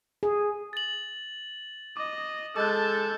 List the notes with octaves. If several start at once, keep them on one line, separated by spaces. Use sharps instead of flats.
G#4
A6 F#7
D#5 D6
G#3 A4 A5 D6 F#6 G6